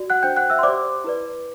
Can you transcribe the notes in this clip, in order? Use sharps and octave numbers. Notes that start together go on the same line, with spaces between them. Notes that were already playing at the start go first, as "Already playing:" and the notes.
Already playing: F#4 D5
F#5 F#6
D4 F#4 C5 G5 G6
F#5 F#6
E5 E6
C6
G4 C5 D5 D6
E4 B4 D5